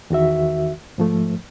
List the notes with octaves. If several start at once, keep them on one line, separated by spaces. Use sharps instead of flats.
E2 D#3 F#4 E5
G#2 F3 A3